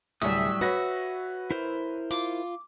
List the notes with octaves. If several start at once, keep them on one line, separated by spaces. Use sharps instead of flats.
D2 A2 C3 F#3 G3 G#4 E5 D#6
F#4 B4 C#5 A#6
E4 A#4 C5
F4 D6